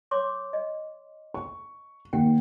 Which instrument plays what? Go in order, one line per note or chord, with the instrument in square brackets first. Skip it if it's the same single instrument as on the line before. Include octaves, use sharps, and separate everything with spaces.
[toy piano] C#5 C6 D6
D#5
[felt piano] C#6
[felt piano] D#2 [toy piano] F#5 G5